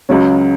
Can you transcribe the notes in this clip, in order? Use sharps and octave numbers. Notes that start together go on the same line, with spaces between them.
C#2 C#3 F#3 C#4